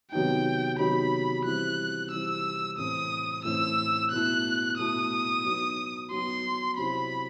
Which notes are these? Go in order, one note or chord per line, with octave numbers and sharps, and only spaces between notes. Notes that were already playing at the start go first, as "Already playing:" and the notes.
C3 D#3 F#3 B3 D#4 G5
C3 D#3 F#3 B3 D#4 B5
E3 G3 C4 E4 F#6
E3 G3 C4 E4 E6
A2 E3 A3 C4 D#6
A2 E3 A3 C4 E6
B2 A3 E4 F#6
B2 A3 E4 D#6
F#3 B3 D#4
F#3 B3 D#4 C6
C3 F#3 C4 E4 B5